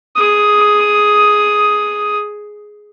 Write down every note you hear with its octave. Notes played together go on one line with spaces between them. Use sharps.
G#4 D#6